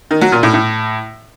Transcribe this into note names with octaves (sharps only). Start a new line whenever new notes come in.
D#3
F#3
A#2
A2
A2